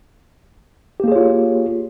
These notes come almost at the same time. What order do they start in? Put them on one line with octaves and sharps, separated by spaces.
G4 A#3 G#4 C#5 F4